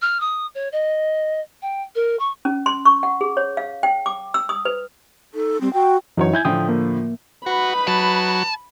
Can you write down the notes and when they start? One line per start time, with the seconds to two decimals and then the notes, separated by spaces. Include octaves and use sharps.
0.02 F6
0.20 D#6
0.55 C#5
0.72 D#5
1.62 G5
1.95 A#4
2.19 C#6
2.45 C#4
2.66 C6
2.85 C#6
3.03 F#5
3.21 G#4
3.37 C#5
3.57 F5
3.83 G5
4.06 D6
4.34 E6
4.49 D#6
4.65 B4
5.34 D#4 A4
5.61 G3 C4
5.73 F#4 G5
6.17 F#2 E3 F#3 D#4 C#5
6.33 E4 G#5 G6 G#6
6.45 A2 D3 F3 G5 D#6
6.69 A#3
7.46 D#4 F#4 B4 B5
7.88 F#3 A5